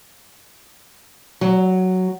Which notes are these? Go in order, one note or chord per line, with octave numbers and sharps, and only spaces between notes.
F#3